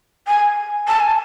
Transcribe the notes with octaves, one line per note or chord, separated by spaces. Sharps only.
G#5
A5
G#5